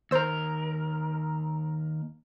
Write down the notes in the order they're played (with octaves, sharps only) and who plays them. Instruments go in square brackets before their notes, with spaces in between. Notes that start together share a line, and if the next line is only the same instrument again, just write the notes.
[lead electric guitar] D#2 A#4 [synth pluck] C5 E6